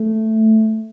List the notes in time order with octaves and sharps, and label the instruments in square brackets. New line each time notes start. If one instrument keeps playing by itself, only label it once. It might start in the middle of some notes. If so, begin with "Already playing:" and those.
Already playing: [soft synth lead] A3